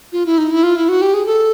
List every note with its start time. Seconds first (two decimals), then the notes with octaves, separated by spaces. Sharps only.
0.12 F4
0.26 E4
0.38 D#4
0.51 E4
0.63 F4
0.76 E4
0.88 F#4
1.02 G4
1.14 G#4
1.26 A4